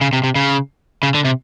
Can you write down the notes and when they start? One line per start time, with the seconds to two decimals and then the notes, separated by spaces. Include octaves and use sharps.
0.01 C#3
0.13 C3
0.24 C3
0.35 C#3
1.03 C#3
1.14 D3
1.25 C3